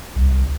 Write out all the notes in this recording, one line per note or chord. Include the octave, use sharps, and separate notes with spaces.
C2